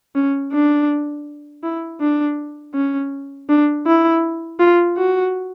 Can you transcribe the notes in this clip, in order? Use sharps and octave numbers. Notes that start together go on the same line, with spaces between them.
C#4
D4
E4
D4
C#4
D4
E4
F4
F#4